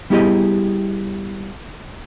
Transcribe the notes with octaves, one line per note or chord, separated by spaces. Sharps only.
G3 B3 E4 G4 G#4 D#5